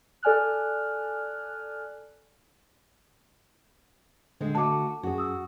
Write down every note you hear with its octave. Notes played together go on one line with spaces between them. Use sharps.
A4 D5 G#5 F6 F#6
D3 G#3 C4
A3 F#4 A5 D6
F#2 F#4 G#4
D#6 E6